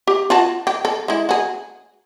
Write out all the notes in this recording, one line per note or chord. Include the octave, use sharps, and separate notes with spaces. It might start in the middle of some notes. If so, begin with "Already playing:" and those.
G4
F4 F#4 A5
G4
A4
G#3 E4
F#4 G#4